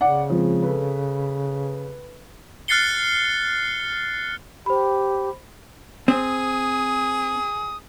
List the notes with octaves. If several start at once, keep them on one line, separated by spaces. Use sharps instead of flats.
C#3 D5 F#5 D6
F3 G#3 C4
A4 B4
F6 F#6 A6 C7 C#7 G7
G4 C5 B5
C4 G#4 D#6